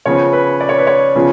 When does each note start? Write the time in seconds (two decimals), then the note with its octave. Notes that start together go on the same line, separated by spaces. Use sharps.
0.05 C#3 F3 B3 C#5
0.33 B4
0.60 D5
0.69 C#5
0.78 B4
0.87 C#5
1.15 C#3 F3 B3 F4